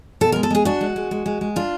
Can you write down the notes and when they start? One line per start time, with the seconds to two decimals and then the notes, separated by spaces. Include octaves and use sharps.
0.21 B2 A4
0.32 G#3 A#4
0.43 A4
0.50 G#3 G#4
0.65 D4 F#4
0.81 G#3
0.96 G#3
1.11 G#3
1.26 G#3
1.41 G#3
1.56 D4 F4